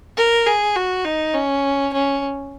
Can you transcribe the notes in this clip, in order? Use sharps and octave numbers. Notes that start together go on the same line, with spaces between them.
A#4
G#4
F#4
D#4
C#4
C#4